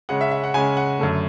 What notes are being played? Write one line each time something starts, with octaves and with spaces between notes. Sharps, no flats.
C#3 G#3 C#4 F#5
E5
E5
F#5
C#3 G#3 C#4 G#5
F#5
F#2 D3 A3